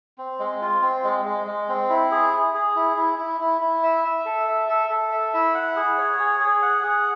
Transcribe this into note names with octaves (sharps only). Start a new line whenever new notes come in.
C4
G#3
F4
C4
G#3
G#3
G#3
C4
E4
G#4
G#4
G#4
E4
E4
E4
E4
E4
E5
E5
A4
E5
A4
A4
E5
E4
F#5
G#4
C#5
G#4
G#4
F#5
G#4